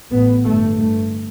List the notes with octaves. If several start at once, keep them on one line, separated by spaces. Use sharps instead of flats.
A1 A2 B3
G1 G2 A3
G1 G2 A3